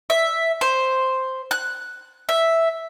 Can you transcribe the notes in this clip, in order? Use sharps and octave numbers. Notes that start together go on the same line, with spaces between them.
E5
C5
F#6
E5